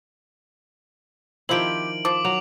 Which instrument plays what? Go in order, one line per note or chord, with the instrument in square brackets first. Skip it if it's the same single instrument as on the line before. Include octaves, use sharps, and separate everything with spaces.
[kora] D#3 F3 E4 [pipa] C4 G4 [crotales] D7 F#7
[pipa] F3 [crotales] D6
[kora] F#3 [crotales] F7